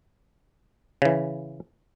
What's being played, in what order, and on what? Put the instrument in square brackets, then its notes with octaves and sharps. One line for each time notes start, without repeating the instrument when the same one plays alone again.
[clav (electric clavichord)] C#3 E3